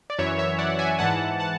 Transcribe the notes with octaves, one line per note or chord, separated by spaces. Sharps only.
D5
F#2 E3 C#5 E5
C#5 E5
D5 F#5
F#5
E5 G#5
G#2 E3 F#5 A5
F#5 A5